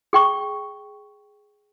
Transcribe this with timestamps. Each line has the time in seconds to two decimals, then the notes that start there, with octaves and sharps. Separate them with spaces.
0.13 G#4 G5 C#6